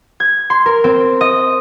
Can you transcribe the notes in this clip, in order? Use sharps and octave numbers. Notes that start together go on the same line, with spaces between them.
G#6
C6
A#4
C4
D#5